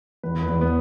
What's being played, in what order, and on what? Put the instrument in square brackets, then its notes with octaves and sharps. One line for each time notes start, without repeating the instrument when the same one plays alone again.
[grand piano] E2 [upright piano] B4
[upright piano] B4
[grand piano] E2
[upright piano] B3